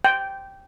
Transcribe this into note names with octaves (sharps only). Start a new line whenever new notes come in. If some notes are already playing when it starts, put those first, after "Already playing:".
G5